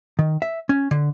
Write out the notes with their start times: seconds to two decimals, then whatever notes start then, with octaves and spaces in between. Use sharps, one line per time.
0.19 D#3
0.42 E5
0.69 C#4
0.91 D3